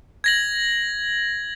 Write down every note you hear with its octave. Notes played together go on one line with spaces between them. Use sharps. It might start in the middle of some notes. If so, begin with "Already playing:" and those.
G#6 A#6 F#7